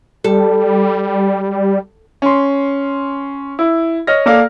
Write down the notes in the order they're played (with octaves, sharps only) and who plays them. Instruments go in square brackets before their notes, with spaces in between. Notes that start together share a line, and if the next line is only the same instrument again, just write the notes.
[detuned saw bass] G3 [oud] A4
[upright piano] C#4 C6
E4
C#5 D#5 F6 A#6
A#3 A4 D5 F5